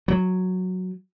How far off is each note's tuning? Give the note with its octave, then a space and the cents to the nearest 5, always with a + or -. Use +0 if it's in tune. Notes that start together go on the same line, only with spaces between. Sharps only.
F#3 -5